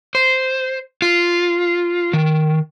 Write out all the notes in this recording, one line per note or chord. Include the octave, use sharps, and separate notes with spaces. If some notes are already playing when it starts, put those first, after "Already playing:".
C5
F4
D#3